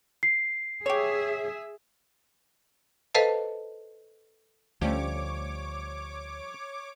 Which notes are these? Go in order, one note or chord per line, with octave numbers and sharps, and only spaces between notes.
C7
G4 G#4 C#5 E5
A4 B4 C5 D#5 F5 A5
D2 F3 G3 A3 C#4 G4 C#5 D6